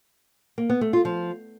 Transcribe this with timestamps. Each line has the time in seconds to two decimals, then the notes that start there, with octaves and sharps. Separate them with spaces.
0.58 A#3
0.70 B3
0.81 A3
0.93 F4
1.05 F3